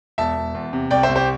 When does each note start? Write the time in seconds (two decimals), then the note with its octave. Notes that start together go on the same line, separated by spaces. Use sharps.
0.18 E1 E5 A5
0.36 E1
0.55 E2
0.73 C3
0.91 C2 D5 G5
1.03 C5 E5
1.09 C2
1.16 G4 C5